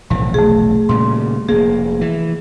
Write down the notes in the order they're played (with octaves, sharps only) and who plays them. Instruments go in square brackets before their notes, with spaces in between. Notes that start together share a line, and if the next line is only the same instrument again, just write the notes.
[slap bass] F1 B1 E3 [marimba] A2
[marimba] A3 G#4
[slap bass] A#2 C#3 G3 [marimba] C6
[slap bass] F1 A#3 [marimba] G#4
[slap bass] E3